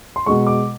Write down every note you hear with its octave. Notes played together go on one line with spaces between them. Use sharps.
C6
B2 G#3 C#6
D6